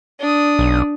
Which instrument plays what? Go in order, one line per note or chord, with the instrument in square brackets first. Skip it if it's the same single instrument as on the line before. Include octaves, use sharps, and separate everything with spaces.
[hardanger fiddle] D4 D#6
[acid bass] B1